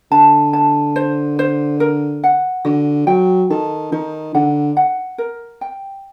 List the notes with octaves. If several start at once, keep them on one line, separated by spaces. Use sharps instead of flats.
D3 A5
A5
C5
C5
A#4
F#5
D3 F#4
F#3 G5
D#3 A4
D#3 D#4
D3 F#5
F#5
A#4
G5